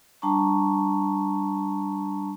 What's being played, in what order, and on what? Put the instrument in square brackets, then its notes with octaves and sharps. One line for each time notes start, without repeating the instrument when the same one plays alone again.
[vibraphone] G3 D4 A5 A#5 C#6